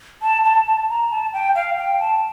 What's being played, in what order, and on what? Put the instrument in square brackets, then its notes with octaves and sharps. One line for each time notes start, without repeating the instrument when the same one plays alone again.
[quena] A5
A5
A5
A#5
A5
G5
F5
G5
A5